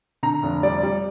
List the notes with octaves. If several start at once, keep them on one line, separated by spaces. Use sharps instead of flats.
D3 A#5
F1
G3 D5
G3